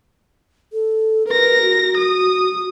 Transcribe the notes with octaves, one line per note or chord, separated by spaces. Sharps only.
A4
A#4 B4 A#6
F#4
D#6